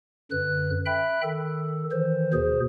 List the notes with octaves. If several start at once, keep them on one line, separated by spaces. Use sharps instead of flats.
F#2 D3 B4 F#6
E5 G5 B5 F#6
D#3 A4
D#3 E3 C5
D#2 B2 G#4 C5